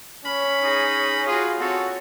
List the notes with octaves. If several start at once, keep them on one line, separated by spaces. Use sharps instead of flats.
C#4 B5
D#4 G#4
F4 F#4 G#4 F5
C4 F#4 A4 C#5